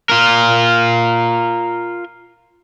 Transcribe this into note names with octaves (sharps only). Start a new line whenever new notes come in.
F4 A#4